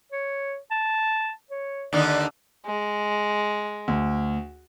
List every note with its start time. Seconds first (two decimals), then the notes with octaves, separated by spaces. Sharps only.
0.12 C#5
0.71 A5
1.51 C#5
1.93 D#2 D3 D#4 D5
2.66 G#3
3.88 D2